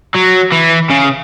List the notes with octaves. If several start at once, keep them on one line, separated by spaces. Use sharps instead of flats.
F#3
E3
C#3